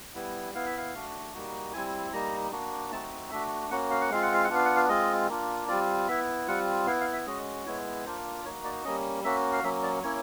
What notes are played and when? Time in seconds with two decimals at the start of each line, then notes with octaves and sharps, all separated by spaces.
0.15 G3 B3 E4
0.54 B3 E4 F5
0.66 E5
0.77 F5
0.94 A3 D4 F#4
1.33 G3 A#3 D#4 F#4
1.73 G3 C4 E4 G#5
2.13 G3 A#3 D#4 A#5
2.52 A#3 D4 F#4
2.92 A3 C4 D#4 F#4 A5
3.31 A3 D4 F#4 E5
3.71 A#3 C#4 F#4 F#5
3.91 F5
4.01 F#5
4.11 G#3 C4 F4 F5
4.22 F#5
4.33 F5
4.44 F#5
4.50 B3 D4 F4 F5
4.65 F#5
4.76 F5
4.89 G#3 C4 F4 D#5
5.29 A#3 D4 F4
5.68 G3 C4 F4 D5
6.08 B3 E4 E5
6.47 G3 C4 F4 F#5
6.87 B3 E4 F5
7.01 F5
7.13 E5
7.26 G#3 C#4 F#4 D#5
7.66 G#3 B3 E4 C#5
8.06 A#3 D4 F4 C5
8.45 A#3 D#4 F#4 C#5
8.64 D5
8.84 G3 A#3 C#4 D#5
9.24 A#3 C#4 F#4 E5
9.53 F5
9.64 F#3 A#3 C#4 E5
9.83 D5
10.03 A#3 C#4 E4 C#5